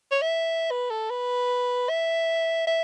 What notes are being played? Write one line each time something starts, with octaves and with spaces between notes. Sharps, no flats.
C#5
E5
B4
A4
B4
E5
E5